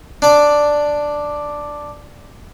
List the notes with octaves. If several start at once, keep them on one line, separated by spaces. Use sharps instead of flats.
D4 D5